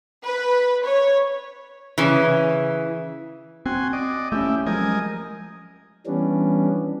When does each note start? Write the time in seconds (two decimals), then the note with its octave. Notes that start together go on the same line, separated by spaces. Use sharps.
0.25 B4
0.87 C#5
1.98 C#3 E3
3.66 C4 F#4 G#5 C6
3.93 D5 D#5
4.32 A3 C#4 E4 G4
4.66 F3 F#3 G#3 A#4 D#5 G#5
6.06 E3 G3 B3 C#4 D4